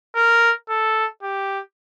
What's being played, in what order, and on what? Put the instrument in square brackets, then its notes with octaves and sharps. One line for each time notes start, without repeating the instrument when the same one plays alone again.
[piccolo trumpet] A#4
A4
G4